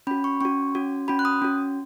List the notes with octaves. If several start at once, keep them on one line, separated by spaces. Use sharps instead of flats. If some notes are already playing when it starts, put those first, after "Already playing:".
C#4 F#4 B5
C#6
C#4 F#4 C#6
C#4 F#4
C#4 F#4 B5
F#6
D#6
C#4 F#4